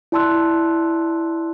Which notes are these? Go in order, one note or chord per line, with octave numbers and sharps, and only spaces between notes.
E4 D5 A5 C6 E6 F#6